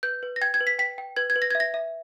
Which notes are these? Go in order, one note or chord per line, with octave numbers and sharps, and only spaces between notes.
B4 G6
B4
A#6
G5 G#6
G#6
B4
B6
G5 B6
G5
B4 G#6
G#6
B4
A#6
G#6
E5
A#6
E5